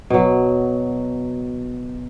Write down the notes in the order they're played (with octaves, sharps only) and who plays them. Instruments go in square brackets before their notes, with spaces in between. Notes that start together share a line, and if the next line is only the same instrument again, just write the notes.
[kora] B2 F#3